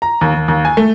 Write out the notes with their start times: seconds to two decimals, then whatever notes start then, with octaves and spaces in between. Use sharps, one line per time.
0.02 A#5
0.21 D#2
0.34 D#2
0.48 D#2
0.65 G#5
0.77 A3